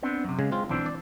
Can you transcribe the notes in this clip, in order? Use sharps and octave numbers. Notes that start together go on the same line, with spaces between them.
B3 C4 D4
F#2 C3
C#3 G#3
C4 F4
B1 E3 C4 D4
D5